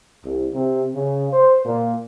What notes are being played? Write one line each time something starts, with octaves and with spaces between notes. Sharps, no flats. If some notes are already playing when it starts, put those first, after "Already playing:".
C2
C3
C#3
C5
A#2